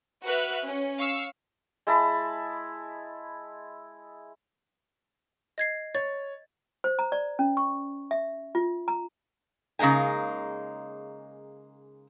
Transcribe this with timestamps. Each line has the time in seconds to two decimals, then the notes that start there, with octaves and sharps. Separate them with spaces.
0.24 F#4 B4 E5 F6 F#6
0.64 C#4
0.98 F5 C#6 E6
1.87 G#3 E4 A5 B5
5.58 D#5 G#6 C7
5.95 C#5 A6
6.84 C5
6.99 A#5
7.12 D5
7.39 C#4
7.57 C#6
8.11 E5
8.55 F4
8.88 A#5
9.79 C#3 G#3 A#3 D#4 G#5